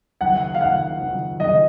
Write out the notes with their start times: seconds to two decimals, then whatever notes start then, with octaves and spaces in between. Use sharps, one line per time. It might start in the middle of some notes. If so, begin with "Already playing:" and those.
0.21 F#1 F2 D#3 F#5
0.55 F5
0.61 F#1 F2 D#3 F#5
1.00 F#1 F2 D#3
1.40 F#1 F2 D#3 D#5